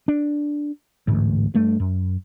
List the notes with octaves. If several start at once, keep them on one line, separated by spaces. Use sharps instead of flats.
D4
A1 D2 G#2
G2 A3
F#2